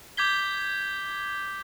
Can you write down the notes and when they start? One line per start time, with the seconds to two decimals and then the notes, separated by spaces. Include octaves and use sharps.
0.17 D6 G6 G#6 B6 G7